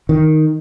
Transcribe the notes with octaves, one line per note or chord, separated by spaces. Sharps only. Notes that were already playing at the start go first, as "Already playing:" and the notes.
D#3